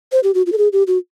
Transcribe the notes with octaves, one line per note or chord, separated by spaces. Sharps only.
C5
G4
F#4
F4
A4
G#4
G4
F#4